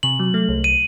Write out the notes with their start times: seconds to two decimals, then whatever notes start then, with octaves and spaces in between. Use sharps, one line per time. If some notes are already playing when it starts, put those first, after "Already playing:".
0.03 C3 F#7
0.19 F#3
0.34 A3
0.49 C2
0.64 D#7